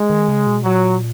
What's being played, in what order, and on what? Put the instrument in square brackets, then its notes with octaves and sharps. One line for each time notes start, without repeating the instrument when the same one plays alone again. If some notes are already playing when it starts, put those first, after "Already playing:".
Already playing: [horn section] G#3
[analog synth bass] D#3
C#3
B2
[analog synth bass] A#2 [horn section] F#3